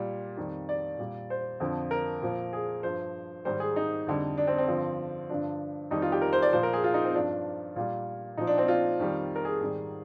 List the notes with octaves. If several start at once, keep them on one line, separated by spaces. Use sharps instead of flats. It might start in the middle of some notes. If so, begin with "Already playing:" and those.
Already playing: A#2 G3
F2 D#3 G3
D5
A#2 G3
C5
F2 D3 F3
A#4
A#2 F3
G#4
G2 F3 C5
G#2 D#3 G3 C5
G#4
D#4
F2 D3 G3
D4
C4
C4
G2 D3 F3
G2 D3 F3 D4
F2 D#3 G3 D#4
F4
G4
A#4
C5
D5
A#2 F3 C5
A#4
G#4
F4
D#4
C4
G2 F3 D4
A#2 G3 F4
A#2 F3 D#4
D4
C4
F4
F2 D#3 G3
A#4
G#4
G#2 D#3 G3